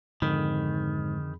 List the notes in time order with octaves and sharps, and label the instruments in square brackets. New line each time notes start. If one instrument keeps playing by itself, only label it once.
[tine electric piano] F2 G#4 B5 [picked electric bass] G#2 [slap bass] D3 [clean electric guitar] D#3